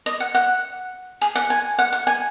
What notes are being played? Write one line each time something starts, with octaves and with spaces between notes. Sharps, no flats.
D#5
F#5
F#5
G#4
F#5
G#5
F#5
F#5
G#5